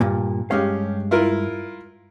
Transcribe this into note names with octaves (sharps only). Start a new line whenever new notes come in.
G2 A#2
G2 G#3 C#4 G4 F5
E4 F4 A#4